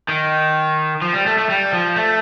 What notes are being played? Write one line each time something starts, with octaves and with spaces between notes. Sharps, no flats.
D#3
F3
G3
A3
A3
G3
F3
A3